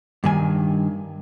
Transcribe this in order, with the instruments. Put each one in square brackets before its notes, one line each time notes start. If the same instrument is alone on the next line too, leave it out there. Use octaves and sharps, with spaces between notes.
[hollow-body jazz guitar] G2 D#3 G#5